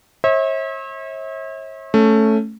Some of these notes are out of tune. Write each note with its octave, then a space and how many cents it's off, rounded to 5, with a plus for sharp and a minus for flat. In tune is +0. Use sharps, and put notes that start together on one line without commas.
C#5 -45 E5 -40
A3 +0 C#4 +0